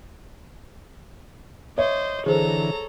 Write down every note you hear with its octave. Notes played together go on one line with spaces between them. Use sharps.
C5 C#5 D#5 E5
D3 E3 G#4 A4 C5 A#5